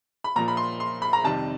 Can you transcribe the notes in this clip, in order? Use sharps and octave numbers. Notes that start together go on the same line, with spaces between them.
B5
A#2 F3 A#3 A#5
B5
C6
C6
B5
A#5
F2 C3 D#3 G3 A5